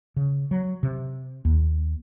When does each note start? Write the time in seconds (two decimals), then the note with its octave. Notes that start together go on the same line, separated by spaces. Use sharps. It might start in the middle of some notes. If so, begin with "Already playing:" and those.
0.16 C#3
0.51 F#3
0.83 C3
1.45 D#2